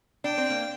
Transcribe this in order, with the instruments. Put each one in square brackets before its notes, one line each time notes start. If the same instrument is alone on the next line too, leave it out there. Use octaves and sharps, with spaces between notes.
[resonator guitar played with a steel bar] D4 [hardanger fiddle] G5
[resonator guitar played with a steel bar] C4
A#3